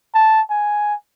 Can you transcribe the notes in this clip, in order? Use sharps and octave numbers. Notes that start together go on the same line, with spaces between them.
A5
G#5